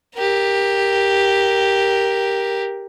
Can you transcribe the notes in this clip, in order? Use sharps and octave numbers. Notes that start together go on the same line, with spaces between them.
G4 A#4